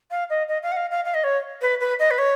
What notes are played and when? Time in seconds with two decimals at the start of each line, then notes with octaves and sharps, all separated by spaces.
0.11 F5
0.30 D#5
0.48 D#5
0.62 F5
0.72 F#5
0.76 F5
0.91 F5
1.05 F5
1.14 D#5
1.24 C#5
1.61 B4
1.80 B4
1.99 D#5
2.10 B4
2.18 C#5